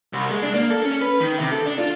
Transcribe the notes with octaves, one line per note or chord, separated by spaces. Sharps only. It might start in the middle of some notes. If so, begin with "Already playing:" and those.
C2
G#3
D4
A#3
A4
C#4
B4
D#3
C3
A4
D4
F4